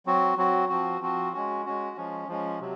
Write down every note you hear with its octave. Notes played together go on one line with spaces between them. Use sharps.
F#3 C4 F#4
F#3 C4 F#4
F3 C4 F#4
F3 C4 F#4
G#3 C#4 F#4
G#3 C#4 F#4
F3 G#3 C#4
F3 G#3 C#4
C3 F#3